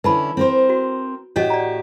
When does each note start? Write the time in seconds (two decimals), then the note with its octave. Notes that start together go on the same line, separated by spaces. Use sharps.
0.04 D3 C#4 E4 B4 A5 B5
0.37 C4 A#4 C5
0.69 F#4
1.36 A2 C#4 F#4 G4 C#5 D#5
1.50 D5 A#5